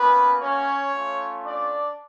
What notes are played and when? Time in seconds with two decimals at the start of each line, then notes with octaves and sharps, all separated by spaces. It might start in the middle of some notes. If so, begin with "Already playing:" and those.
Already playing: A#3 B3 C#4 F#4 B4
0.42 C#4 C#5
0.93 A3 C#4 F4
1.46 D4 D5